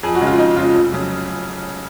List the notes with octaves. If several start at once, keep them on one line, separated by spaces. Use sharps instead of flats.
F2 G#4
F#4
C#3 G#3
F4
F2 D#4
C#3 G#3 F4
F1
F2 C#3 F#3